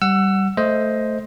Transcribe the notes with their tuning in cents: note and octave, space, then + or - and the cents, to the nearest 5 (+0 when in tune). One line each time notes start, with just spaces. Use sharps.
G3 -15 F#5 +0 E6 +25
A3 +0 C5 +0 D#5 +15